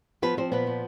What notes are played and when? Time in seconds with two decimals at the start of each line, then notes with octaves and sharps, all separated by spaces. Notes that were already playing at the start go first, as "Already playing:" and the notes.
0.22 F3 B3 B4
0.37 F3 C4 C5
0.52 A#2 B3 B4
0.67 F3